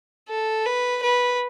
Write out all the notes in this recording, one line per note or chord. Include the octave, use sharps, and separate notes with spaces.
A4
B4
B4